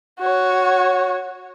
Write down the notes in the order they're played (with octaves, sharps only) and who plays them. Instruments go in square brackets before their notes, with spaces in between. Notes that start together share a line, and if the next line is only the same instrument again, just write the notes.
[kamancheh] F#4 C#5